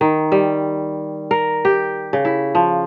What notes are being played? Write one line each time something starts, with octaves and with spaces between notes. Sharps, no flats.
D#3
G3
A#4
G4
C#3
E4
F3